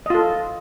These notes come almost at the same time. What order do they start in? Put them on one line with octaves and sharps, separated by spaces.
D#5 F4 A4